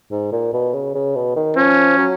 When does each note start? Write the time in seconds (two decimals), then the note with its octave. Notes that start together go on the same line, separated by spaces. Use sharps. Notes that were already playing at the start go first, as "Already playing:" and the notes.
0.11 G#2
0.32 A#2
0.53 B2
0.74 C#3
0.95 C#3
1.15 B2
1.36 D#3
1.56 F3 C#4
1.98 F#3